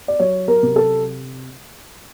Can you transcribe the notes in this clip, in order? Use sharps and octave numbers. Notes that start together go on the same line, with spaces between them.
D5
F#3 C#5
A#4
C3
A4